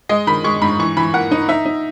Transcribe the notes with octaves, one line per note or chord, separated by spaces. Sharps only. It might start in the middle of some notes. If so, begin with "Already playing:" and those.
G#3 D#5
D#3 B5
G#3 C#6
G#2 B5
E3 C#6
E3 B5
A#3 F#5
D#4
D#4 E5
D#4